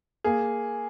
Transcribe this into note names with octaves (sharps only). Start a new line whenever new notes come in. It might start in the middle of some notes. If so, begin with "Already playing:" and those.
A#3 G#4